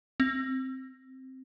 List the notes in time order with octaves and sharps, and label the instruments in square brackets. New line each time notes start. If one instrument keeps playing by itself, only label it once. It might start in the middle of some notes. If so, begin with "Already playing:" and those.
[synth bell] C4